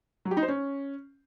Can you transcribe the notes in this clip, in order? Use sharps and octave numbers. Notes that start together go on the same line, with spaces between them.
F#3
G4
D#4
C5
C#4